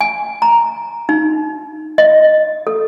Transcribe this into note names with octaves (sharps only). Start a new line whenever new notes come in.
G#5
A#5
D#4
D#5
A4